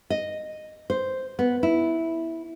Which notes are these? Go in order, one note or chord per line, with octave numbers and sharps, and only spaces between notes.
D#5
C5
B3
E4